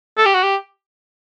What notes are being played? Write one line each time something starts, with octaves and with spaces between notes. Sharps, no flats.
A4
G4
F#4
G4